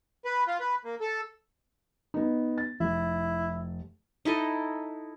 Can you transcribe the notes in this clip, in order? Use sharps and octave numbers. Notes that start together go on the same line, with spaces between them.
B4
F4
B4
A#3
A4
B3 D#4
A6
F1 E4
D#4 E4 A4 D#5